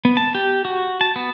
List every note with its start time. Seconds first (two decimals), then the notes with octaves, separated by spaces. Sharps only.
0.05 B3
0.17 A5
0.35 G4
0.65 F#4
1.01 A5
1.16 B3